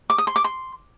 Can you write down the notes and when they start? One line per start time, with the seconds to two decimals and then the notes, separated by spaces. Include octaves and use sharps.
0.10 D6
0.18 D#6
0.27 C6
0.36 D6
0.44 C6